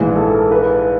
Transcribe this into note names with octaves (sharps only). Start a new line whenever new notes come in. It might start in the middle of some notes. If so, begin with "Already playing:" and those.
Already playing: A#1 G#2 E3 G#4
A4
A4
A#4
B4